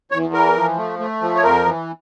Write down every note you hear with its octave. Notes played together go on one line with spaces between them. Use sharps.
E2 C#5
E3 A#4
F3
A3
A3
F3
C#5
F2 A#4
E3